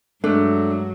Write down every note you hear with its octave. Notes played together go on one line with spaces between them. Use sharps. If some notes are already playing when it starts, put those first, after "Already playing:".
G2 F#3 G#3 A3 D4